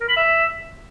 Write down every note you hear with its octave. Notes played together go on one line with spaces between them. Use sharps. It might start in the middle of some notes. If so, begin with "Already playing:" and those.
A#4
B5
E5